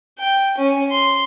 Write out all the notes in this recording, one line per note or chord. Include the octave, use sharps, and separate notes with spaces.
G5
C#4
C6